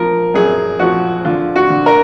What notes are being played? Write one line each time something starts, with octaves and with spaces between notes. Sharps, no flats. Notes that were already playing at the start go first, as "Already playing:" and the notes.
Already playing: F3 A#4
F#2 G#4
F3 F#4
D3 F4
F#4
D3
A#4